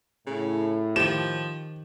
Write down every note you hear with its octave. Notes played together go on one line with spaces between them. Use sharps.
A2 C#3
D#3 F3 G4 E7